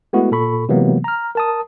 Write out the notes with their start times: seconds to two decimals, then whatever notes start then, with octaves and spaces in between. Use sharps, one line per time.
0.13 G#3 A3 B3 E4 F#4
0.31 A#2 A4 B5 C#6
0.69 C3 E3 F#3 G#3 A#3 B3
1.04 A#5 F6
1.35 A#4 A5 D#6